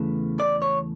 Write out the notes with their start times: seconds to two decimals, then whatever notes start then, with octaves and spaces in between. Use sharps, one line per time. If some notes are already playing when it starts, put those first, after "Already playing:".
Already playing: E2 C#3 E3 A3
0.40 D5
0.62 C#5